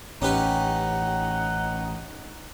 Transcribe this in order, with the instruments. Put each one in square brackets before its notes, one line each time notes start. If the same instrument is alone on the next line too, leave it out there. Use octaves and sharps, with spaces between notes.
[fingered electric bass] A1 [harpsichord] C#4 G4 B4 [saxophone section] D#4 F#5